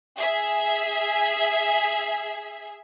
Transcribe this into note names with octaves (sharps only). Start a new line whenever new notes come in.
G#4 E5 G#5